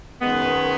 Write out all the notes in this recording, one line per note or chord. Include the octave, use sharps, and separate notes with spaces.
F#2 D#3 G#3 B3